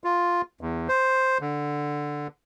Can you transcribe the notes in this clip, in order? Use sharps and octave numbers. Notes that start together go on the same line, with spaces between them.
F4
E2
C5
D3